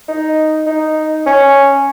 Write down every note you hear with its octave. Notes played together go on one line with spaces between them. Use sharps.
D#4
D#4
C#4